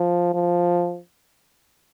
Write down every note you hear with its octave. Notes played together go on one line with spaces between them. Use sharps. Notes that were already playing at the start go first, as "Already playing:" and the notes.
Already playing: F3
F3